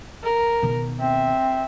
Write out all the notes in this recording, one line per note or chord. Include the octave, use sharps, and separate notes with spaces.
A#4
B2 D#3
C4 E5